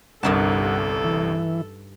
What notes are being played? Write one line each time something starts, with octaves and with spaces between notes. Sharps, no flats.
G1 C2 G2 D#4 A4 A#4 F#5 A5
E3